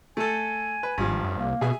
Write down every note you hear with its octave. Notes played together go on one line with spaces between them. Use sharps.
A3 A4 G#5
B4
G#1 G2 F3
F#2
C2 A#3
B2 G#4 E5 G#5